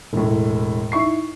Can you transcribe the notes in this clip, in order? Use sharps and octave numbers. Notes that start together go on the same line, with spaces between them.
E1 A2
D#4 E4 C#6 C7